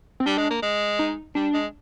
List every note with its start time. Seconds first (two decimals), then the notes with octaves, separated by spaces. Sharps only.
0.20 C4
0.26 G3 D4
0.38 G#3
0.50 A#3
0.62 G#3
0.99 D#4
1.35 G3 D4
1.53 G#3